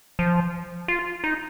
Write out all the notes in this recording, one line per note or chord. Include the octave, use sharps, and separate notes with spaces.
F3
F4
D#4